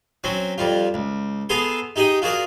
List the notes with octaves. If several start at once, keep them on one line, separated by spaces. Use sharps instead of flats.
F#3 C4 C#4
F2 G3 F4
C#2
B3 G#4 A4 G#5 A#5 C6
D#4 G4 G#4 D#5 D#6
F4 F#4 G#4 A#4 D5